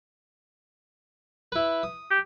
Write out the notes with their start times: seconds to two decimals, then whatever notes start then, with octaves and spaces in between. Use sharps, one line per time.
1.52 E4 B4
1.83 D#6
2.11 G4